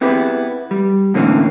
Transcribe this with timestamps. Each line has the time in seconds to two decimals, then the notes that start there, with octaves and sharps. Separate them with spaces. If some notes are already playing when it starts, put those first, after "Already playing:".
0.01 B3 C4 E4 G4 G#4 B4
0.71 G3
1.14 A2 D3 E3 A#3 C4 C#4